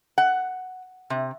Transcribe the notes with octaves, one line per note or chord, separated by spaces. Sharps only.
F#5
C3